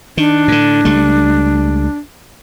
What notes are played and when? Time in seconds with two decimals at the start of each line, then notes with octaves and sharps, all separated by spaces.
0.17 D#3 D4
0.48 A2 D3
0.85 C#2 G3 A3